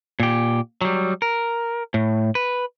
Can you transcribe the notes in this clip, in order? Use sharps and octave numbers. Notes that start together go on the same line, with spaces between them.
A#2 G4
F#3 G3
A#4
A2
B4